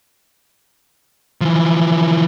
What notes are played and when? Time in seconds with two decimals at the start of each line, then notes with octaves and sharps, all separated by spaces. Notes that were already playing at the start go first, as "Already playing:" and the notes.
1.41 E3 F3